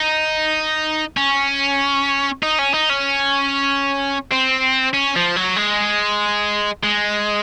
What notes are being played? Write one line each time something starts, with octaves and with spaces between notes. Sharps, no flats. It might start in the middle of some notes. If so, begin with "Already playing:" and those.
Already playing: D#4
C#4
D#4
C#4
D#4
C#4
C4
C#4
F3
F#3
G#3
G#3